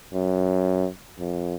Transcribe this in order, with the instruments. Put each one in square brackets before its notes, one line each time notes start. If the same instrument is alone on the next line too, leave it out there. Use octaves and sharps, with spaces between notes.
[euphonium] F#2
F2